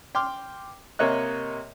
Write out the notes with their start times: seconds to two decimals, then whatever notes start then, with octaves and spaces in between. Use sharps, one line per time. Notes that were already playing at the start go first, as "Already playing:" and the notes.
0.15 G5 C6 D6 F6
0.99 C3 A#3 C#5 D#5 F#6